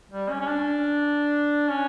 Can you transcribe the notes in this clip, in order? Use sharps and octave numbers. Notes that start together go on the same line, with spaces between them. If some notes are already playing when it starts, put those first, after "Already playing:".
G3
C#4
C#4
D4
C#4